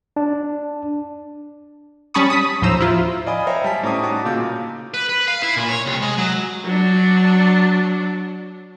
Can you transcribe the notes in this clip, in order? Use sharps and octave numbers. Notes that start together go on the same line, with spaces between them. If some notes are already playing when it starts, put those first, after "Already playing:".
D4
G3 C#4 A5 B5 C#6 D#6
D#6 B6
D#2 A2 F3 C5 A#5 E6
E4 F4
D5 D#5 F5 G#5 B5 D#6
C5 C#5 E5 G5 A#5 A#6
G3 G#5 A5 B6
A2 C#4 A#5 D6 D#6
D#4 F#4 A5 A#5 D6 D#6
A#2 C#3 A#3 F5 G6
B4
B4
F5
E4
A#2
C#5
C2
G#3
F#3
F#3 D4